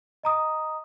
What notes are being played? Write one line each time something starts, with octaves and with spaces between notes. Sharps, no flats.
D#5 A#5 D#6